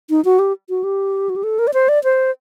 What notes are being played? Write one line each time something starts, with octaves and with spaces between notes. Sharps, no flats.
D#4
F#4
G4
F#4
G4
F#4
G4
A4
A#4
D5
C5
D5
C5